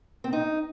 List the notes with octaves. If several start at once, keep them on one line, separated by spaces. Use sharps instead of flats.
C4
D#4